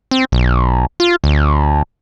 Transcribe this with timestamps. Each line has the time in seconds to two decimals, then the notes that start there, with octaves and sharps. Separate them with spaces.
0.11 C4
0.32 B1
1.00 F4
1.24 D2